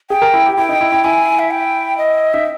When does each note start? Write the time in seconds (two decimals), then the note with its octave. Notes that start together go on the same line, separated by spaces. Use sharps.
0.10 G#4 G5
0.22 A#4
0.34 E4
0.46 G4
0.57 E4 G5
0.69 D#4
0.81 E4
0.92 E4
1.04 E4 G#5
1.39 E5
1.51 G5
1.98 D#5
2.34 D#4 E5